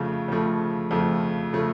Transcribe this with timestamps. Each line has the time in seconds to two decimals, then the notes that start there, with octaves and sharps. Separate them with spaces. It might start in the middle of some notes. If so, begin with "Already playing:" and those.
Already playing: F2 C#3 F3 A3
0.28 F2 C#3 F3 A3
0.91 F2 C#3 F3 A3
1.53 C#3 F3 A3